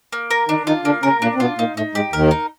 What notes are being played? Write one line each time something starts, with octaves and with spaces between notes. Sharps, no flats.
A#3
A#4
D#3 D4 D#4
D#3 D#4 F4
D3 A#3 D4
C#3 C#4 A#4
A#2 A#3 D4
C4
B2 B3 F4
A#2 A#3 D#4
A2 A3 D#4
G#2 G#3 G4
D#2 D#3 A#4
D#4